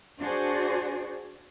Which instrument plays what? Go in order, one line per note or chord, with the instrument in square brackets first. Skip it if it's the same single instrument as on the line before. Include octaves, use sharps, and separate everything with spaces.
[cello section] D4 F#4 G#4 C5